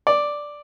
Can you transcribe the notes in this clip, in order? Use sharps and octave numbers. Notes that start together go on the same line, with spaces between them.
D5